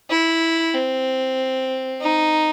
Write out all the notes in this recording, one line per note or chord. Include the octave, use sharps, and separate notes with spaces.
E4
C4
D#4